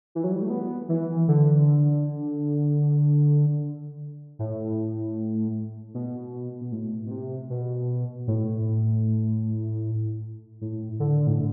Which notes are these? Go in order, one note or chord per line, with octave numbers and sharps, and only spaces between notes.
E3
F#3
G3
A3
B3
E3
D3
A2
B2
B2
A2
B2
C3
B2
A2
A2
D3
A2